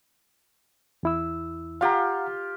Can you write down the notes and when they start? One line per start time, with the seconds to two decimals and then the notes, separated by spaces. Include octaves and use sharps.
1.03 E2 E4 E6
1.81 F4 G4 F5 F#5 A#5